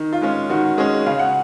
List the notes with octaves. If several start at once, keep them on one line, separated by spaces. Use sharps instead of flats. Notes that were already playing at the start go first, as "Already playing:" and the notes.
Already playing: D#3
F4
G#3 C#4
D#3 F#4
G#3 C#4 G#4
C#3 F5
F#5